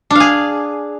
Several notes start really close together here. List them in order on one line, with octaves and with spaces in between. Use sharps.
D4 F5 G#4